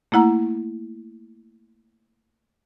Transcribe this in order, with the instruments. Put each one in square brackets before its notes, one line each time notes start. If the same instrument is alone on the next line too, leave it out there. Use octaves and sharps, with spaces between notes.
[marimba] A3 A#3 E4 F#5 A#5